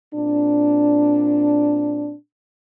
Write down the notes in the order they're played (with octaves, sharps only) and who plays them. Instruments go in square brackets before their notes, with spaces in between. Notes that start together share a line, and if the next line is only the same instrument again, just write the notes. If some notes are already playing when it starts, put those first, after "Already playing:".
[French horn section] A#2 C4 D4